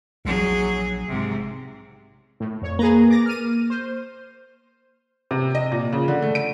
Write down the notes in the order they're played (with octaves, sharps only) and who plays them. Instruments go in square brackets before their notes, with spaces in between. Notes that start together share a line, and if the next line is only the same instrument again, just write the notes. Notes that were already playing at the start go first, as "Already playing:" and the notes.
[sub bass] A#1 [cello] F#3 G#4
[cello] G#2 C3
[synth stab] A2
F2 C#5
[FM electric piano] A#3 [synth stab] G#4 B4 A#5
[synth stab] D6 A6 A#6
F6 D#7
C5
[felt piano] C3
D#5
A#2
C#3
D3
A3
D7